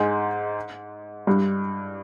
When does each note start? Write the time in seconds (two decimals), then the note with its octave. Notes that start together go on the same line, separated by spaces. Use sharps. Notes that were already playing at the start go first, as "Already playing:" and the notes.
Already playing: G#2 G#3
1.27 G2 G3